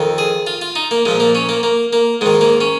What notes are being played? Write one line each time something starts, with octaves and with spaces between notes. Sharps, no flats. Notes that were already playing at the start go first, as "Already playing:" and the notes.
Already playing: F2 D#3
G#4
F4
F4
D#4
A#3
A#2 F3 G#3
A#3
C#4
A#3
A#3
A#3
G#2 D#3 G#3
A#3
C#4